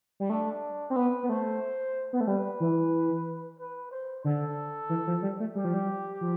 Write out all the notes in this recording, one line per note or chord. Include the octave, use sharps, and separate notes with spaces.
G3
A3 D4
C4
B3 B4
B3
A3 C5
B3
A3
G3 B4
E3
B4
C5
D3 A4
E3
F3
G3
A3
G3 G4
F3
G3
F3